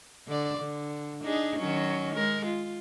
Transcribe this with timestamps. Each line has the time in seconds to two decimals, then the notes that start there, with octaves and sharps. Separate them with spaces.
0.27 D3 D5
0.57 D3
1.24 D4 D#4 G#4
1.59 D#3 F#3 C#4
2.15 G#3 A#4
2.45 F4